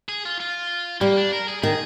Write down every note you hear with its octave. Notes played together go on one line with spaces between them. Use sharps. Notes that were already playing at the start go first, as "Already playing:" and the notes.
G#4
F4
F4
G3 A#3
D4
A#4
G#4
D#3 G#4